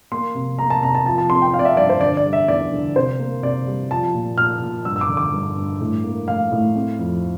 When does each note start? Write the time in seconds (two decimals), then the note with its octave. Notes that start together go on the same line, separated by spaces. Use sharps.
0.12 A#3 C6
0.35 C3
0.58 A#3 A#5
0.70 A5
0.83 C3 A#5
0.95 A5
1.06 F3 A5
1.18 A5
1.30 C4 C6
1.42 G5
1.54 C4 F5
1.59 D5
1.65 E5
1.77 G2 D5
1.89 C5
2.01 D3 D5
2.17 D5
2.25 G3
2.33 E5
2.48 E2 D5
2.72 D3
2.96 C3 C5
3.19 A#3
3.43 C3 D5
3.67 G3
3.91 F3 A5
4.14 A#2
4.38 A#2 F6
4.62 A#2
4.85 G2 E6
4.96 E6
5.01 D6
5.09 D3
5.17 D6
5.33 G2
5.57 G2
5.81 A2
6.04 A#3
6.28 A2 F5
6.52 A2
6.75 C4
6.99 F2